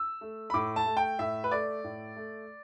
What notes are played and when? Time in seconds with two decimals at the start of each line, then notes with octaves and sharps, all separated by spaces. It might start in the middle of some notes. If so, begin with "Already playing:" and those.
Already playing: E6
0.21 A3
0.50 B5
0.54 A2 D6
0.76 A5
0.86 A3
0.97 G5
1.19 A2 E5
1.44 B4
1.51 A3 D5
1.84 A2
2.16 A3